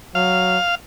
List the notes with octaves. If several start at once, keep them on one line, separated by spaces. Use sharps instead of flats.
F#3 F5